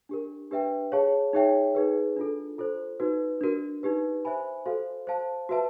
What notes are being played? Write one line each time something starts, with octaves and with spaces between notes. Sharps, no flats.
D4 G4 A#4
D4 G4 B4 E5 G5
G#4 C#5 F5 A5
D#4 G#4 C#5 E5 G5
D#4 G#4 B4
D4 F4 A4
F4 A4 C5
D#4 F#4 B4
D4 F#4 A#4
D#4 G4 B4
C5 E5 G#5 B5
F#4 A4 C5 F5
C5 F5 A5
F#4 B4 E5 A5